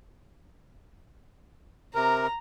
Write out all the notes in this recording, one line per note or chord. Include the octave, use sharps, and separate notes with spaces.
C3 A#4 A#5